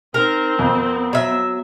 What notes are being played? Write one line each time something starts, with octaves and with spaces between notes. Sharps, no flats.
C4 D#4 A#4
F2 B3
F#3 E5